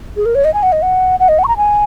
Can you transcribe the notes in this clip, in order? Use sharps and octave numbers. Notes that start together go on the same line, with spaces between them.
G#4
A#4
C#5
D#5
G#5
F#5
D#5
F#5
F#5
D#5
F#5
C#6
A#5
G#5